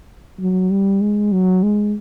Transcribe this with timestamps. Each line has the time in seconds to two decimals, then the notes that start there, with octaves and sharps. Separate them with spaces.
0.39 F#3
0.71 G3
1.01 G#3
1.32 F#3
1.63 G#3